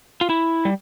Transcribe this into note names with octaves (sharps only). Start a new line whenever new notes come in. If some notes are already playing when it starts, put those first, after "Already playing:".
F4
E4
G3